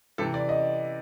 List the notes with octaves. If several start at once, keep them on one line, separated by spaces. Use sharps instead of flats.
C3 E3 A4
D5
D#5